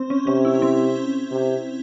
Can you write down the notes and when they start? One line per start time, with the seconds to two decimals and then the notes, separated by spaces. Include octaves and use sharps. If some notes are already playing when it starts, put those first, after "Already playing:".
Already playing: C4
0.10 C#4
0.27 C3 C#4
0.45 E4
0.62 C4
1.31 C3